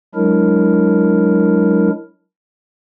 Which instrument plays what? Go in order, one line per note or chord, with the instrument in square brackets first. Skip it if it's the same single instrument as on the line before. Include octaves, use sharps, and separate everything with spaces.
[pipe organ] F#3 G#3 D4 E4 A#4